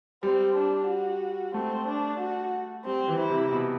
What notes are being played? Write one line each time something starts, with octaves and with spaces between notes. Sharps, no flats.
G3 C4
D4
F#4
A3 C4
D4
F#4
G3 C4
E3
E4
C3
B2